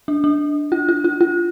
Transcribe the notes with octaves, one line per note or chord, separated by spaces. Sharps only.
D4
D4
F4
F4
F4
F4